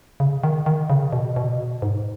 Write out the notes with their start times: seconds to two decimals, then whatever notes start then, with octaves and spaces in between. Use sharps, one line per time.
0.20 C#3
0.44 D#3
0.66 D#3
0.90 C#3
1.13 B2
1.36 B2
1.82 G#2